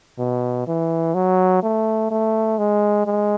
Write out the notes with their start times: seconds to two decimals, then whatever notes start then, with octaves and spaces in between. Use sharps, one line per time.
0.19 B2
0.68 E3
1.15 F#3
1.63 A3
2.11 A3
2.59 G#3
3.07 G#3